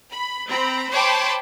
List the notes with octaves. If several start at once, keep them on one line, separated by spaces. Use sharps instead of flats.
B5
C4 A#5 B5
C5 C#5 G5 A5 B5 D6